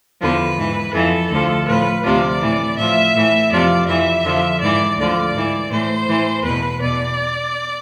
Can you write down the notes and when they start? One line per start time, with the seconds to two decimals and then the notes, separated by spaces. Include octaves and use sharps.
0.20 E2 D3 F3 B4
0.58 G#2 E3
0.94 F2 E3 A4
1.30 D2 D3 F3
1.67 A2 F3 B4
2.03 D2 C3 F3 D5
2.41 A2 E3
2.77 A2 F3 E5
3.14 A2 E3
3.50 F2 C3 F3 D5
3.87 F2 E3 E5
4.24 F2 D3 F3
4.60 G#2 E3 D5
4.97 D2 D3 F3 D5
5.33 G#2 E3
5.70 A2 E3 C5
6.07 A2 E3
6.43 E2 B2 B4
6.81 E2 B2 D5